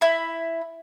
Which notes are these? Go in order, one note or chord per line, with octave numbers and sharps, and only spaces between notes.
E4 B5